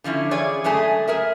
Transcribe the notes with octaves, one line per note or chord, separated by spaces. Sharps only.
D3 F3 C#4 E4
E3 G#4 C#5 D5
F#2 G#3 A3 G#4 A5
G#4 A#4 E5